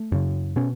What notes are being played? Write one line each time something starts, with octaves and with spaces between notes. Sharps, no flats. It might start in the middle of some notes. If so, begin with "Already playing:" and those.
Already playing: A3
F#2 C#3
B2 C#4